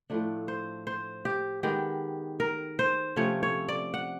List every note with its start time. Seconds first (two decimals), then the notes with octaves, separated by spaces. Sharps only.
0.10 A2 F3 A3 D4
0.48 C5
0.87 C5
1.25 G4
1.63 D#3 G#3 B3 G4
2.40 A#4
2.79 C5
3.16 C3 F3 A3 C#4 C#5
3.43 C#5
3.69 D5
3.94 F#5